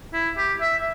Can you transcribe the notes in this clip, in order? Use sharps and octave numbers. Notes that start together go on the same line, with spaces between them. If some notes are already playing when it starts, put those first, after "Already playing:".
E4
G4
E5